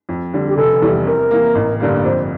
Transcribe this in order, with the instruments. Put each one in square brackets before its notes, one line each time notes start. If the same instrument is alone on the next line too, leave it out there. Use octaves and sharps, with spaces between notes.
[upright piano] F2
D3 G3
[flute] G4
[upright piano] F1 [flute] A4
[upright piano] E2 E3 G3
[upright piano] C3 [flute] A#4
[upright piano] E3 A#3
A1
G2 D3 G3 A#3
[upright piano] F2 [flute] C5